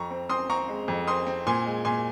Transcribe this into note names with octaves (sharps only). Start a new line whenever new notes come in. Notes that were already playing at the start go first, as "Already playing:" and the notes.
Already playing: F2 A#5 C#6
C4
C4 C6 D#6
C4 A#5 C#6
G#3
F2
C4 C6 D#6
C4
A#2 G#5 C6
G#3
A#2 G#5 C6